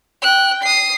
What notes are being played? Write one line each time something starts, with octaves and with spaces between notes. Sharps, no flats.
G5 F#6
D#6 C7